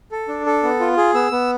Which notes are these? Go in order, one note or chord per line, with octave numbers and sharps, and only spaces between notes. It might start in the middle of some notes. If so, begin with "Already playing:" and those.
A4
D4
A4
B3
F4
G#4
B3 E6
B3